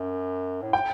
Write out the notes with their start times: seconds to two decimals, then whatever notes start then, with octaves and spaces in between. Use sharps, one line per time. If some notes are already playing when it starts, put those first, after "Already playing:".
Already playing: F#2
0.63 A2
0.73 G5